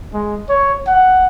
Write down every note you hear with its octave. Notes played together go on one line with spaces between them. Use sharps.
G#3
C#5
F#5